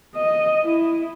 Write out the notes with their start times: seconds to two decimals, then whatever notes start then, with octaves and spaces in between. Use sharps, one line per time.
0.16 D#5
0.64 E4